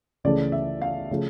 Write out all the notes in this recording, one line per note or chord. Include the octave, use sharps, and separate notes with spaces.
C#2 C#3 E3 A3 D5
E5
F5
C#3 F3 A3